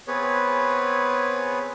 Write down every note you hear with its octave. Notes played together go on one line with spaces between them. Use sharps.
B3 C4 G#4 B4 C#5